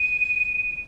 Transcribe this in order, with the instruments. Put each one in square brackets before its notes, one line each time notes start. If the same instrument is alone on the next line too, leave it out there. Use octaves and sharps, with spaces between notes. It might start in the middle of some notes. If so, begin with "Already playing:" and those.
Already playing: [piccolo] D#7